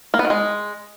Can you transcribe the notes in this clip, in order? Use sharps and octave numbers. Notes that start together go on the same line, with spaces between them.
A#3
B3
D#3
G#3